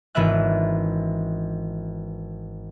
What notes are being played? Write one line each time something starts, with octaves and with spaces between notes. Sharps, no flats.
G#1 E3 B3 C#4 E5 F#6